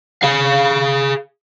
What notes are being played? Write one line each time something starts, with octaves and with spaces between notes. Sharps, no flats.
G#4 F5